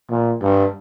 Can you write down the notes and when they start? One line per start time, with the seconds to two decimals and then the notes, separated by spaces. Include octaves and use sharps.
0.10 A#2
0.42 G2